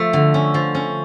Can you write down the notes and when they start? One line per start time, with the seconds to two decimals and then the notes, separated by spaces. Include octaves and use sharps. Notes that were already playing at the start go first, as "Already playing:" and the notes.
Already playing: F3 A3
0.13 D3
0.34 C#4
0.54 F3
0.75 C#4